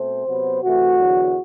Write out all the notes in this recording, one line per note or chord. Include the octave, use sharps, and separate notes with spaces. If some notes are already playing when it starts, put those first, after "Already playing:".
Already playing: B2 A3 C4 C5
C3 F#3 B3
C3 E3 A3 F#4
E2 D3 F#3